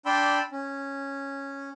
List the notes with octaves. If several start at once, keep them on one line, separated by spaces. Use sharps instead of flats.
D4 D5 G5 B5 C6 E6
C#4